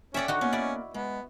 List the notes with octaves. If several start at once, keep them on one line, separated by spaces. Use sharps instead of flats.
C#4 A4 D5 E5 F#5 G5
D3 D#4 F#4
A#3 B3 C#4
E4 D5
G#3 B3